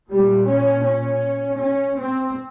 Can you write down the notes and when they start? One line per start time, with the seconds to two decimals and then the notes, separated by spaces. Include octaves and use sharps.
0.10 A#2 G3
0.47 C#4
0.85 C#4
1.60 C#4
1.98 C4